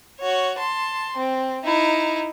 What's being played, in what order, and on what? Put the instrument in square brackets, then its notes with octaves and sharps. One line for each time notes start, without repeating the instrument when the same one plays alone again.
[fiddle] F#4 C#5
A5 C6
C4
D#4 E4